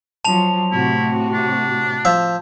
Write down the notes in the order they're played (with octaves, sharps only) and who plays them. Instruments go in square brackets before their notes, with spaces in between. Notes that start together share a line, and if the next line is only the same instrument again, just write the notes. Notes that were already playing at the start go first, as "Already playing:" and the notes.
[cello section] F3 F#3 [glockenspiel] A5 F7
[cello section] A2 C3 F#4 [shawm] E4
[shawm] D4
[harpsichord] F3 E5